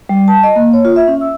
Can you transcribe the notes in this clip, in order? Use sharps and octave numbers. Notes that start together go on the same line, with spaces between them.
G3
A5
D#5
A#3
C#5
F4
E5
C#4
E6